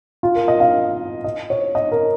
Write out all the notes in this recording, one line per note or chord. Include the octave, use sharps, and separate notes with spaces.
F4
A#4
D#5
F5
D#5
C#5
D#5
A#4